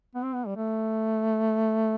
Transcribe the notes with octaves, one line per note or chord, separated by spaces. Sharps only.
B3
C4
B3
G3
A3